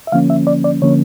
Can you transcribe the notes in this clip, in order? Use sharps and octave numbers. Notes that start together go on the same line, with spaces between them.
E5
D3 F3 A#3 C#4 F5
E5
D5
D5
D3 F3 A#3 C#4 C#5